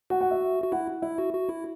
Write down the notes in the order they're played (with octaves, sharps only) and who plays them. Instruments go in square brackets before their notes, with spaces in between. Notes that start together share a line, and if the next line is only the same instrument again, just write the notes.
[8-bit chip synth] F#4 [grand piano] F#5
[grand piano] F#5
E5
[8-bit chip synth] F#4
[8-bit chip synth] E4 [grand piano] F#5
[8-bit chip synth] E4 [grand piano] E5
[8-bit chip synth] F#4
F#4
E4